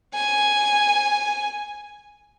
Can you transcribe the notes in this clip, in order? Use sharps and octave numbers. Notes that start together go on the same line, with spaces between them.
G#5